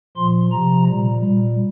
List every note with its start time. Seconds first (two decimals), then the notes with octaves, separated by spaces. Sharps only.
0.16 A#2 F3 C6
0.52 C3 F3 A#5
0.88 A#2 G3
1.24 A#2 G3